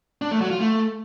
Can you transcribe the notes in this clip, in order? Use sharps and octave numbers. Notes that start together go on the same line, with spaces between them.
D4
A3
F#3
F4
A3